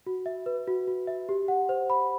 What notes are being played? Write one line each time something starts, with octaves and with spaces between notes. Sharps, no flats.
F#4
E5
B4
F#4
F#4
E5
G4
F#5
C5
B5